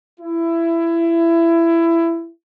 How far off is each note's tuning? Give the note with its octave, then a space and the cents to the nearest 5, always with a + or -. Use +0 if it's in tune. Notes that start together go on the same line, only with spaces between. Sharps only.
E4 +20